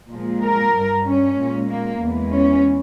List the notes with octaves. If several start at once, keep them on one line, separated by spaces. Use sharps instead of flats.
A#2 F3 G#3
A#4
G2 G3
C#4
A#2 G#3
A#3
E2 E3 G#3
C#4